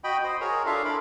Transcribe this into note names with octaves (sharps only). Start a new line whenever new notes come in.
F#4 D#5 G5 B5
C5 D#5
F#4 G#4 A#4 C#5
D4 F4 A4 E5 F5
E4 A#4 B5 D6